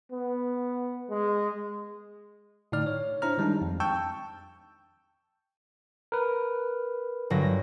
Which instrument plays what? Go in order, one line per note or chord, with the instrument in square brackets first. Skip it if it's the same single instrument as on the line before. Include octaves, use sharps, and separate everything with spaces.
[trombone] B3
G#3
[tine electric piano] A2 D3 D#4 D5 F6
C#5
D4 E4 C5 A#5 F6
D#3 G3 G#3 D4 D#4
F2
G5 A5 C#6 E6 G6
A#4 B4
[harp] G1 F#3 A#6